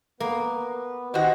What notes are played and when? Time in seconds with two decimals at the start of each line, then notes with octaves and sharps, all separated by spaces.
0.20 A#3 B3 B4
1.14 D#3 F#4 G4 C5 D#5